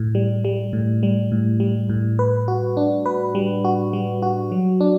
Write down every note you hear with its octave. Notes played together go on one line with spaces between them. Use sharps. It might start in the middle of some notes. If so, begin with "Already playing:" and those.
Already playing: A2
G3
G3
A2
G3
A2
G3
A2
B4
F#4
D4
B4
G3
F#4
G3
F#4
F#3
D4